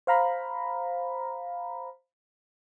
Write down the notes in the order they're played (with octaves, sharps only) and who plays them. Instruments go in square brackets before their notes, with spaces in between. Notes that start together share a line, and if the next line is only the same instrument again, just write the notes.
[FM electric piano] C5 F5 A#5 B5